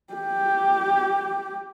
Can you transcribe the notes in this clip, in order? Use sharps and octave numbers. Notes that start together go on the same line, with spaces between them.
G4